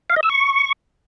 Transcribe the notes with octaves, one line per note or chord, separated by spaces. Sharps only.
F5
D#5
E6
C#6